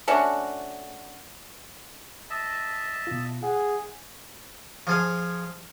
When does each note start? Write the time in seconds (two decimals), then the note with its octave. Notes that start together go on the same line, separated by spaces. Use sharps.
0.08 A3 C#4 D4 F#4
2.30 D#5 E5 A5
3.07 B2 F4
3.43 G#4 F#5
4.87 F3 G#4 F5